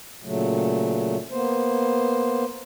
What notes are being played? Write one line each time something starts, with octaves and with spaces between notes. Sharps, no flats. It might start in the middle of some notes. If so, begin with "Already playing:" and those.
A#2 C#3 F#3 A3
A#3 B3 C5